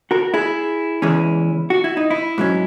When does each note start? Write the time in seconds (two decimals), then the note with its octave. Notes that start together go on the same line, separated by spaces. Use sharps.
0.11 F#4 A#4
0.34 E4 G#4
1.02 E2 C#3 E3 G#3 C#4
1.70 F#4
1.84 E4
1.97 D#4
2.10 E4
2.38 G#2 F#3 C#4